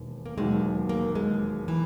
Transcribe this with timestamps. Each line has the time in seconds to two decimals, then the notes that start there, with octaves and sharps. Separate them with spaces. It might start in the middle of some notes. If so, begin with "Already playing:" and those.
Already playing: E1 D#2
0.26 A#3
0.37 E1 D#2 D#3 F#3 G#3
0.89 A#3
1.15 G#3
1.68 E3